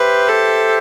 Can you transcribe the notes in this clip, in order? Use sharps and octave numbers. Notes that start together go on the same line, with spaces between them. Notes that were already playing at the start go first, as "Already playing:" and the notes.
Already playing: G4 B4 C5 E5
A4